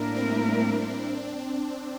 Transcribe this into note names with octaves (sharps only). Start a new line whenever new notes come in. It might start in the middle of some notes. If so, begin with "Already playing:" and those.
Already playing: A2 G3 A#3 D4 E4 A#4
C4